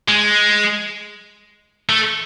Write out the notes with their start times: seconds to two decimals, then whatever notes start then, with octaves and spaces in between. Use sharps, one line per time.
0.09 G#3
1.89 A3